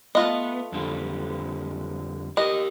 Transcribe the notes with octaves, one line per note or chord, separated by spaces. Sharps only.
A3 B3 F4 D#5
F2 D3 G3
G4 A#4 D#5